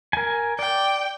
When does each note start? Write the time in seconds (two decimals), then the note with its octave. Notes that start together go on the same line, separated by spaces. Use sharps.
0.13 A#4 G#5
0.59 D5 G5